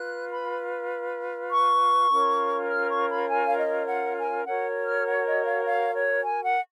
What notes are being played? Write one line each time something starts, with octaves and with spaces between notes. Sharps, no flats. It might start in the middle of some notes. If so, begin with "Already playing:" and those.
Already playing: F4 B4 F#6
B5
C#6
C#4 F4 A#4 C#5
F6
C#6
B5
G#5
F5
D#5
F#5
G#5
F#4 A#4 C#5 F#5
F6
F#5
D#5
F5
F5
C#5
G#5
F#5